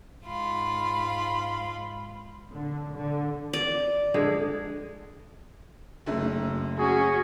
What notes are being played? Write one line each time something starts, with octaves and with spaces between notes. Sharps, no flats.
G#2 F4 B5
D3
D3
D5
D3 G#3 G#4
F#1 F#2 A3
C#4 F#4 G#4